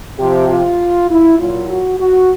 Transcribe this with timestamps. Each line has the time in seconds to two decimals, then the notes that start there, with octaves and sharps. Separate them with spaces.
0.19 C3 F3 G4
0.49 F4
1.10 E4
1.39 A#2 F#3 F4
1.69 F#4
2.00 F#4